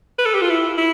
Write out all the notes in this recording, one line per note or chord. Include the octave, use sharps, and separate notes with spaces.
B4
A4
G4
F4
E4
E4